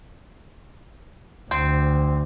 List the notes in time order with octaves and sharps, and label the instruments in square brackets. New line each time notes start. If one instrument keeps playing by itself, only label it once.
[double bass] D2 [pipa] C4